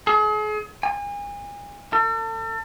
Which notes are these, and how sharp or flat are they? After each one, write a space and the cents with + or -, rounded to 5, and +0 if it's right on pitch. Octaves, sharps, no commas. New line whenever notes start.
G#4 +40
G#5 -35
A4 +40